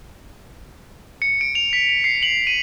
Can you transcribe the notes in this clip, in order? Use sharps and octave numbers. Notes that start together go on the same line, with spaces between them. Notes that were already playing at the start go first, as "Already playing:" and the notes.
C#7
D7
F7
B6
F7
C7
F#7
D#7